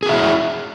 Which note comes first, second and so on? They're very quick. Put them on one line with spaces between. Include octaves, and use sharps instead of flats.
G#4 F#4 E5 E4